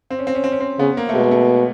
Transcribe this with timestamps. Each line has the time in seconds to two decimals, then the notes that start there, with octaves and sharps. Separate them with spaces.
0.10 C4
0.19 C#4
0.27 C4
0.35 C#4
0.44 C4
0.52 C#4
0.60 C4
0.79 C#3 B3
0.97 A#3
1.09 A3
1.14 B2 G#3
1.31 A3